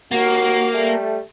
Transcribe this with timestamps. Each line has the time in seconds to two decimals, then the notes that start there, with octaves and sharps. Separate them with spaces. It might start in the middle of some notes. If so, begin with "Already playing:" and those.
0.12 D#2 A#3 F#4
0.74 G3 A3